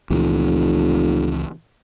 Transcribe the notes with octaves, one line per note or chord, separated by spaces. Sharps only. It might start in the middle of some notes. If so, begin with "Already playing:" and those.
F1 C#2 A#2 E3